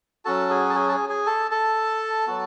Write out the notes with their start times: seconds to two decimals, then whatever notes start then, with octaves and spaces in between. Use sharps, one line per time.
0.25 F#3 C#4 F#4 A4 A5
0.50 G#4 G#5
0.70 A5
0.75 G#4 G#5
0.88 A5
0.92 G#4 G#5
1.09 G#4 G#5
1.26 A4 A5
1.51 A4 A5
2.27 F#3 B3 F#4